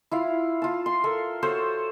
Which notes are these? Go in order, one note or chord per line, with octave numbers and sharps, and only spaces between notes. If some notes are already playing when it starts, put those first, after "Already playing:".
E4 F4 F5
F4 A5
C6
A4 A#4
F#4 A4 C5 C#5